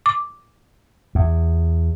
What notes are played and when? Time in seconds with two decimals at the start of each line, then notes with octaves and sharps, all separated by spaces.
0.06 D6
1.15 E2